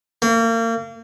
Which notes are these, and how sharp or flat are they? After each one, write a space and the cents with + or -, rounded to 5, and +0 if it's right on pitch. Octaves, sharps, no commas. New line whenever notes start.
A#3 -35